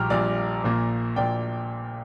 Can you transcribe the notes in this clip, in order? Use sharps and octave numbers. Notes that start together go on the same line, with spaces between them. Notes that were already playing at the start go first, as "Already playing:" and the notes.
Already playing: A#1 A#2 G3 G5 A#5 D6 F6
A#1 A#2 G3 D5
A#1 A#2 A#3
A#1 A#2 A#3 D5 G5